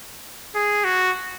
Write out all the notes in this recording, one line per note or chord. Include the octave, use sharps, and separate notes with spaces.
G#4
F#4